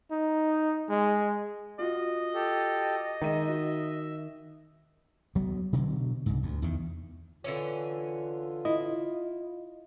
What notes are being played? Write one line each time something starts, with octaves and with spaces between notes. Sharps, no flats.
D#4
G#3
F4 F#4 D#5
G4 A4
D#3 G#3 D#4 E5 D#7
F#4
D2 F#3 B3
B2 D3 F#3
C2 G#2
D2
E2 D#3
D3 E3 C#4 F4
E4 D#5